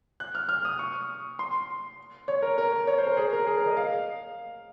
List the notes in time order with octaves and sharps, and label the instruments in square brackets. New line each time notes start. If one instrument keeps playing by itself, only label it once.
[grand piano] F#6
F6
F6
D#6
C#6
C6
C#5
A#4
A#4
C#5
C5
A#4
G#4
A#4
G#4
A#4
D#5
F5